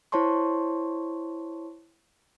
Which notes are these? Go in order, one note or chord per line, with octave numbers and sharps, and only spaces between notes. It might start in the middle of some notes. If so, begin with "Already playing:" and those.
E4 C5 C#5 A5 C6 C#6